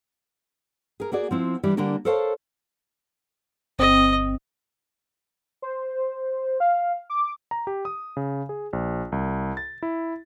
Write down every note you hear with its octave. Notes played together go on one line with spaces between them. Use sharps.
G#4 A#4
A#3 F#4 G#4 D5
F3 C4 E4
E3 G3 D4
D3 G3 A#3 D4 A#4
A4 A#4 C5 C#5 F5 A5
G1 C4 D#5
C5
F5
D6
A#5
G4
D#6
C#3
G#4
A#1
C2
A6
E4